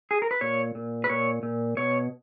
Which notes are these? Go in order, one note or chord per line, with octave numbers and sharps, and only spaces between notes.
G#4
A#4
B4
A#2 C#5
A#2
B4
A#2 C#5
A#2
B2 C#5